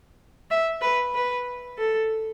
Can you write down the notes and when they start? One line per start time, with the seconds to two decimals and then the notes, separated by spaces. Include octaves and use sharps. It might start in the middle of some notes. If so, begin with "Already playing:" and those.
0.51 E5
0.82 B4
1.14 B4
1.78 A4